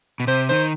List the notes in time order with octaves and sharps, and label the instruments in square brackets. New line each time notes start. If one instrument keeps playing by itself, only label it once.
[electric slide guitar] B2
[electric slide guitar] C3 [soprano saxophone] C5
[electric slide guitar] D#3 [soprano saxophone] C5